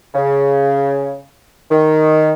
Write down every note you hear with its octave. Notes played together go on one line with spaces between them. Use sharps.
C#3
D#3